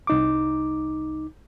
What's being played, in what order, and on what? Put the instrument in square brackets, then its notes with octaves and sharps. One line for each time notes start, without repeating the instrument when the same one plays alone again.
[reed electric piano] C2 D#4 D6